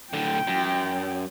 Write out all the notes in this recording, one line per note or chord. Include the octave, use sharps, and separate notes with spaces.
A2 D3 G5
F#2